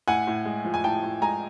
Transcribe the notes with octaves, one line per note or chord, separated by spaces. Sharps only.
A2 F#5 G#5
A2
G#3
F3
G#5
A2 G5 A5
A2
G#3 G#5 A#5